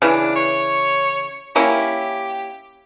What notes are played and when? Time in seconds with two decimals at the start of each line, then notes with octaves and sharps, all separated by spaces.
0.02 C#3 E3 D4
0.36 C#5
1.56 A#3 C#4 E4 G4